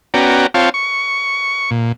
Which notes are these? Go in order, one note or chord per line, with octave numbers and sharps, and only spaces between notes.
B3 C#4 F#4 D5 G5 A#5
C4 F4 C#5 F5 G5 A5
C#6
A#2